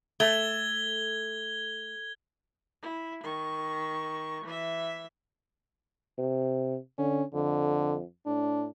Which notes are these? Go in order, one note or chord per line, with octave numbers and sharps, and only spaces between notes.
A3 G#6 G7
E4
D#3 C#6
E3 E5
C3
D3 C#4
F2 D3
A2 D4